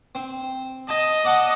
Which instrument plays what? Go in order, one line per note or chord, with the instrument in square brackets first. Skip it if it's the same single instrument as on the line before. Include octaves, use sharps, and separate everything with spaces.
[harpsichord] C4
[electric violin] D#5 [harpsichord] A5
[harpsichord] D5 F#5 A5